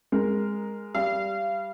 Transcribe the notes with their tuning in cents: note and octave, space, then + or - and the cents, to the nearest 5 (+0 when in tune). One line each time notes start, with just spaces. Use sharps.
G#3 -10 A#4 +0
G3 +0 F5 -30